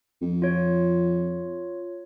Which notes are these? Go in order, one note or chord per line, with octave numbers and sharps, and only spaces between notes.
F2
F4 C#5